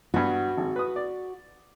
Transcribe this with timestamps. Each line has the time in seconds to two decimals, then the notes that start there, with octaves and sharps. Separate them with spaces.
0.14 G2 B3 F#4
0.57 G#1
0.76 B4 D#6
0.96 D5